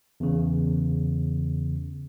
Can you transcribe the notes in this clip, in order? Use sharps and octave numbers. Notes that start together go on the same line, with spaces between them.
E2 C#3